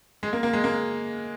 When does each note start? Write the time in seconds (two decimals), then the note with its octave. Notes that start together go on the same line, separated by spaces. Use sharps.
0.23 G#3
0.33 A#3
0.43 A#3
0.53 G#3
0.64 A#3